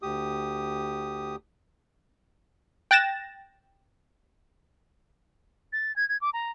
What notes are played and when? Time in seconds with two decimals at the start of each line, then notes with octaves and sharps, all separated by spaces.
0.02 D2 G4 D#6
2.91 G5 F#6 A6 A#6 E7
5.73 A6
5.96 G#6
6.09 G#6
6.21 D6
6.33 A#5